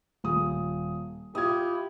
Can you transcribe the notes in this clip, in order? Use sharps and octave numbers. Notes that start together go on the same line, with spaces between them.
D#1 D#6
E4 F4 G4 D#6 G#6